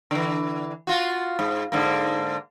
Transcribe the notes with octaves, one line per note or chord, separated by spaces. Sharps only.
D3 E3
F4 F#4
G#2
G#2 D3 A#3